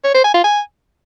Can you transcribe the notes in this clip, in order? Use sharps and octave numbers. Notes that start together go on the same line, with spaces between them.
C#5
C5
G#5
F4
G#5